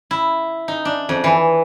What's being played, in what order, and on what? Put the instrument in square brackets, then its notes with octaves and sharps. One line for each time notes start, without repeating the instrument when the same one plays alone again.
[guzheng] E4
D#4
D4
F2
E3